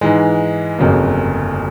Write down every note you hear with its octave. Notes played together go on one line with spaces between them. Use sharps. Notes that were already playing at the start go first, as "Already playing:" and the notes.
G#2 E3 G#3
G1 F2 C#3 F#3 A#3